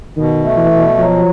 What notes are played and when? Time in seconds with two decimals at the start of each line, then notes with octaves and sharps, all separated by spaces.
0.17 B2 D#3
0.44 A3
0.57 E3
0.71 B2
0.98 F3 F#3